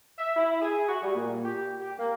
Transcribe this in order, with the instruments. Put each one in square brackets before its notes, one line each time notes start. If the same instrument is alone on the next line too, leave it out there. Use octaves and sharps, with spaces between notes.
[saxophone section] E5
E4
G#4
F#4
G3
A#2
G4
G4
A#3